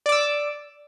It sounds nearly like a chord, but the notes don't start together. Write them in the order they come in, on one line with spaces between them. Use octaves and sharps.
D5 D6 E6